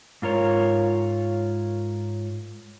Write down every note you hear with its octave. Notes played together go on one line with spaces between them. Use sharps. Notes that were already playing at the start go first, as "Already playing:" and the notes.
G#2 F4 A#4 C#5